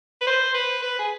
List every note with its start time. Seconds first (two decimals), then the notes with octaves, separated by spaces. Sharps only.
0.21 B4
0.27 C5
0.54 B4
0.82 B4
0.99 G#4